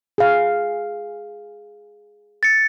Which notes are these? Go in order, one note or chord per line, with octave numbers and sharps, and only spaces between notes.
G#4 F5
A6 C#7